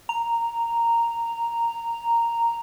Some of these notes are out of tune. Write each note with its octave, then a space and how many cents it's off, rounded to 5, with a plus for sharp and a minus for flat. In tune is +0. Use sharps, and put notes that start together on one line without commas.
A#5 -5